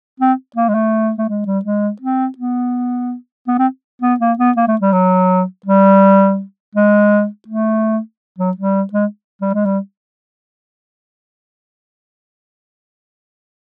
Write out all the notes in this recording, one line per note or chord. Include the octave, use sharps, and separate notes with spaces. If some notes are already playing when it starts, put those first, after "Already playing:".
C4
A#3
G#3
A3
A3
G#3
G3
G#3
C4
B3
B3
C4
B3
A#3
B3
A#3
A3
G3
F#3
G3
G#3
A3
F#3
G3
G#3
G3
G#3
G3